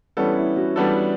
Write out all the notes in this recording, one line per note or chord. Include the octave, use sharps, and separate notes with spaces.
E3 G3 B3 C#4 D4 A4
E4
F#4
E3 G3 B3 D4 A4